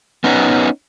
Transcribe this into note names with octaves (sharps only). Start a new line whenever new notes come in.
B3 C#4 D#4